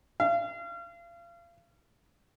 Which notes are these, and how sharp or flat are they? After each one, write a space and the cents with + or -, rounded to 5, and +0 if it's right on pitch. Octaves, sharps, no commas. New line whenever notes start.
F5 -35